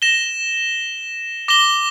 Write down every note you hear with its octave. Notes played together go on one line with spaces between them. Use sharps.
A#6 E7 G7
D6 A#6 E7 G7